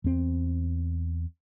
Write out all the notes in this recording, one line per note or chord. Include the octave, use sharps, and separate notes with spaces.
E2 C4